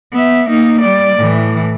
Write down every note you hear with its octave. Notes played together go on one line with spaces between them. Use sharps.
B3 E5
A#3 D#4
G3 D5
A2 E3